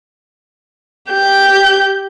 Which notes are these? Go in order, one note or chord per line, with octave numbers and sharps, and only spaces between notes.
G4 G6